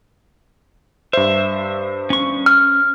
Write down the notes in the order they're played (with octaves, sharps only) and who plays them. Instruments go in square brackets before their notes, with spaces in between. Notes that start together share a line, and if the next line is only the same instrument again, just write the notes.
[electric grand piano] G2 C5 [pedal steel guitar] E5
[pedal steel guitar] C#4 C#6
[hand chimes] F6